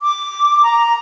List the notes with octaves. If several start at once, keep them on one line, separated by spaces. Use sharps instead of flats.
D6
A#5